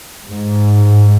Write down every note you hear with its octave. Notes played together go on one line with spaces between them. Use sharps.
G#2